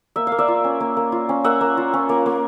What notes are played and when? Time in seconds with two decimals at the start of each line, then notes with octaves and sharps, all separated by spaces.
0.16 A#3 E5
0.27 A#3 F5
0.39 D5 E5
0.48 F4
0.64 C#4
0.80 A#3
0.97 A#3
1.12 F4
1.29 C#4
1.44 A#3 E5 F#5
1.61 A#3
1.77 F4
1.94 C#4
2.09 A#3
2.26 A#3